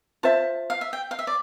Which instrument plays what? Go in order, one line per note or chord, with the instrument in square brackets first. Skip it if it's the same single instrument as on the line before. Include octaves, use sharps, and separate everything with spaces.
[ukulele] F4 C5 E5 [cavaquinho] A5
[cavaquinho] F5
E5
G5
F5
E5
D5